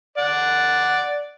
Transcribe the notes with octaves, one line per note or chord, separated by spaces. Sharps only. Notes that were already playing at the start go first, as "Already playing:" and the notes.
D5 F#5